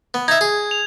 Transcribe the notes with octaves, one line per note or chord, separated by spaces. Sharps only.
B3
D#4 E5 G#6
G#4
F7